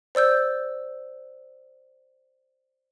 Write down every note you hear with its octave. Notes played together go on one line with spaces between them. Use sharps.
C5 D5 E6 G6